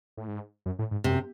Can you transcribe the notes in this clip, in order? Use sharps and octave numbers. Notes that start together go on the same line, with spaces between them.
A2
G#2
F#2
A2
G#2
F#2 C3